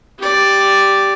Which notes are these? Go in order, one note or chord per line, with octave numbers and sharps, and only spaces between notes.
G4 D5